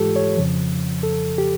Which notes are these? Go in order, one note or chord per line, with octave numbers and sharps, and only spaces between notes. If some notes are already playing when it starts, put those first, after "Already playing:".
Already playing: G#2 E3 G#3 F4 G4 A4
C#5
F2 C#3 F3
A4
G4